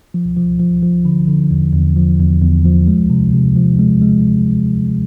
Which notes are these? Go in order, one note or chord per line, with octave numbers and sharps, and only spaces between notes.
F3
F3
F3
F3
D3
D3
E2
E2
F3
E2
E2
F3
G#3
C3
C3
F3
G#3
G#3